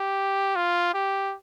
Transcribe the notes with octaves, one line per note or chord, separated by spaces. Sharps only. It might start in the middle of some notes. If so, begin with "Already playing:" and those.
Already playing: G4
F4
G4